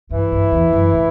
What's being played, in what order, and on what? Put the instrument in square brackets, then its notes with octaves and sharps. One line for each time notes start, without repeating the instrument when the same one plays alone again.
[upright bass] G2 [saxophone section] E3 E4
[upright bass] G2
E2
F#2
A2